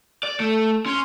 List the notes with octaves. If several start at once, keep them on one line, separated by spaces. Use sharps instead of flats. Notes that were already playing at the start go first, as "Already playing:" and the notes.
D5
A3
C#4 C6